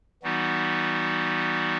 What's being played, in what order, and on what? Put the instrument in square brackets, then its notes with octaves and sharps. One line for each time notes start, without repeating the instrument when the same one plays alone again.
[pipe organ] E3 G3 B3 D#4 F#4